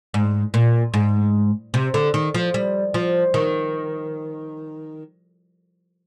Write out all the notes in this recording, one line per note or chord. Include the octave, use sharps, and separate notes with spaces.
G#2
A#2
G#2
C3
D3
D#3
F3
G3
F3
D#3